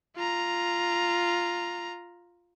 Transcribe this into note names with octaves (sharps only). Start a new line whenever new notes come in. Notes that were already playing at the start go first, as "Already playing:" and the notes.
F4 A#5